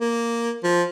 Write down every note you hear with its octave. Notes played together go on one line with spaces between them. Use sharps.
A#3
F3